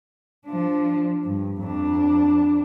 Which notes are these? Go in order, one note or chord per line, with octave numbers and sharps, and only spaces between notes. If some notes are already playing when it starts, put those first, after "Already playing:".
F3 D4
G2
F2 D4